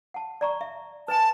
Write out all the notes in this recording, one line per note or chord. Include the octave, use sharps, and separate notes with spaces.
F#5 A5
D5 A#5 C#6
E5
B4 G#5 A5